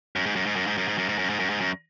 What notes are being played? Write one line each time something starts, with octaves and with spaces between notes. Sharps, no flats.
F#2
G#2
F#2
G#2
F#2
G#2
F#2
G#2
F#2
G#2
F#2
G#2
F#2
G#2
F#2